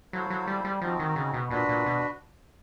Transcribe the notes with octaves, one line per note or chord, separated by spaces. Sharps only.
F#3 E4 A4 C5 F5
F#3
G3
G3
F3 C4 D#4 F#4
D#3
C#3
B2
A#2 D4 F#4 B4
A#2
B2